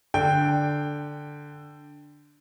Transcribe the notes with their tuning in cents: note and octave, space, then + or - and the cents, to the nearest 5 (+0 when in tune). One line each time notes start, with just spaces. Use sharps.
D3 +0 G5 +0